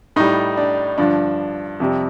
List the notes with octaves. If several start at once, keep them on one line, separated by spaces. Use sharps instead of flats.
A2 G3 D#4
D4
G2 D3 F3 D4
F2 C3 G3